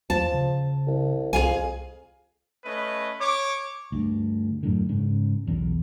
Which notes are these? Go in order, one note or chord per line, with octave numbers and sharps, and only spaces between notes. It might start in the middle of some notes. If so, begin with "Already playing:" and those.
D#2 F3 A5
C#3
C2
C2 F2 G#4 F5 G#5
A3 C#4 B4 D#5
C#5 D6
D2 G2
F#2 A2 D3
G#2 C#3
B1 E2